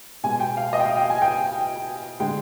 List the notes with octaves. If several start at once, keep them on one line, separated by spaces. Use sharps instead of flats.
B2 G#3 G#5
G5
F5
D#5
G5
F5
G5
G#5
G5
D3 G#3 G5